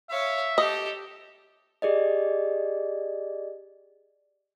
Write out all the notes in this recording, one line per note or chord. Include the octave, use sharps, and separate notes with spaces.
C#5 E5 F5
G4 A4 D#5
G4 G#4 D5 D#5